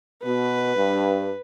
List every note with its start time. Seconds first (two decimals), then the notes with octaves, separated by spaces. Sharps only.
0.23 B2 B4
0.75 G2